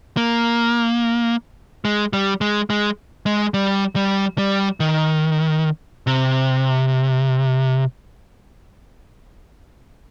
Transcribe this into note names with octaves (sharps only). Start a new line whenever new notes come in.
A#3
G#3
G3
G#3
G#3
G#3
G3
G3
G3
D#3
C3